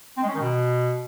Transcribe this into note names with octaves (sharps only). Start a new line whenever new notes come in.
C4
G#3
C#4
D#3
B2